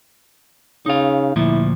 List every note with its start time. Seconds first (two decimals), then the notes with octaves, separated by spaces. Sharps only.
0.86 C#3 D#4 F5
1.36 D2 A#2 F3 E4